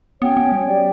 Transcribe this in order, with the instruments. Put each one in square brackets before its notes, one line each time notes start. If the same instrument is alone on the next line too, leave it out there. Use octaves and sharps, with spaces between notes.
[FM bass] B3 [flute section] C#4 F#4 C#5 G5
[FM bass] B3
G3
[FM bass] F#3 [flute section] G4 D5 G5